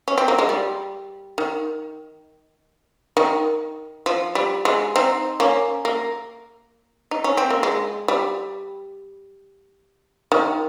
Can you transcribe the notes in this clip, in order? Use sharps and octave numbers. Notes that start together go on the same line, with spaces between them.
C#4
C4
A#3
G#3
G3
D#3
D#3
F3
G3
G#3
C4 D#4
A#3 C#4
A#3
D#4
C#4
C4
A#3
G#3
G3
D#3